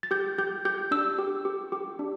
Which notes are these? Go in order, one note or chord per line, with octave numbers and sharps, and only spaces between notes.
A6
G4 G6
G4 G6
G4 G6
D4 E6
G4
G4
G4
D4